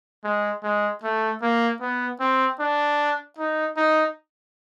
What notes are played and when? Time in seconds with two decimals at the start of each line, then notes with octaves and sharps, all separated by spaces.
0.24 G#3
0.63 G#3
1.03 A3
1.42 A#3
1.81 B3
2.20 C4
2.60 D4
3.38 D#4
3.77 D#4